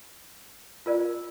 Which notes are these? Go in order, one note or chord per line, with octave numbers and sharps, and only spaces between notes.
F4 A#4 D5